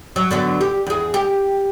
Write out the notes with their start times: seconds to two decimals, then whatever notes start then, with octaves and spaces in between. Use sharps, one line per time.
0.16 F#3
0.31 D3 F#3 B3
0.61 G4
0.87 E2 G#4
1.14 G4